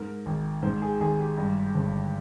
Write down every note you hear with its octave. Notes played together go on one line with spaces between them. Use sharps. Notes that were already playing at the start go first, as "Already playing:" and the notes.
Already playing: G#2 A#4
G#1
G#2 C5
G#4
G#1 G#4
G4
G2
G1